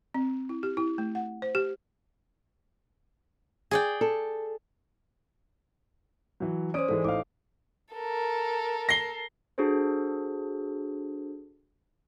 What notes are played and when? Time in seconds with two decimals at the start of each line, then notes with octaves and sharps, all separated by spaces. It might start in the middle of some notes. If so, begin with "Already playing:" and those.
0.14 C4
0.49 E4
0.63 G4
0.77 E4
0.98 A3
1.15 F#5
1.42 C5
1.55 G4
3.71 G#4 D5 G5
4.01 A4
6.40 E3 F#3
6.74 C#4 C5 D5 D#6 D7
6.88 G#2 E3 G#3 A4
7.04 A1 D#4 F5 D6
7.93 A4 A#4
8.89 A#6 C7 G7
9.58 D4 F#4 G#4 A4 C5